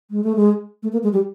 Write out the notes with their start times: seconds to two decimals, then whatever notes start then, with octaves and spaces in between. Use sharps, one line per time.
0.11 G#3
0.24 A3
0.36 G#3
0.83 A3
0.92 A#3
1.03 G#3
1.13 G3